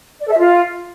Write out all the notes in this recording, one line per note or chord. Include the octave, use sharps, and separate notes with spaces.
D5
A4
E5
F4